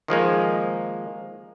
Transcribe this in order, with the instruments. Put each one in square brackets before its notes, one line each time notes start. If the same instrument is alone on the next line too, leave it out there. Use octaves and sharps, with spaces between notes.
[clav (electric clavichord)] D#3 F3 G#3 A#3